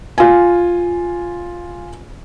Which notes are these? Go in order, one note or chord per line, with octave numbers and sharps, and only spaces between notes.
F4 G#5